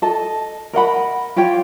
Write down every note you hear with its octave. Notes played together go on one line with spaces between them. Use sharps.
A4 D#5 A5
A#4 D#5 F#5 B5
F4 G4 C#5 G5